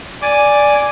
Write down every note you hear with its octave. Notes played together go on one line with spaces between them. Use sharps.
D5 G#5 D6